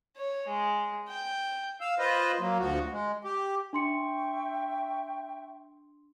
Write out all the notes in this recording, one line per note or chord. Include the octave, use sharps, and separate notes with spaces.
C#5
G#3
G5
F5 E6
F4 B4 C5 D#5
F#3 A#3
D2 F3 F#4
G#3
G4
D4 E5 G5 C6 C#6 C#7